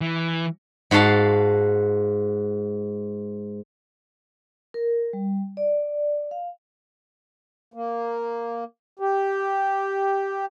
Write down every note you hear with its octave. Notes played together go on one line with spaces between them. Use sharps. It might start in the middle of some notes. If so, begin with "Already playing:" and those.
E3
G#2 F#4 F5 A5 C6
A#4
G3
D5
F5
A#3
G4